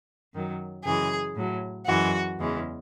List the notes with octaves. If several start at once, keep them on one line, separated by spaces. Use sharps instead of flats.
F#2 D#3 F#3
F#2 C#3 E3 G#3 G#4
A2 F#3
F#2 E3 G#3 F#4
E2 C#3 E3 G#3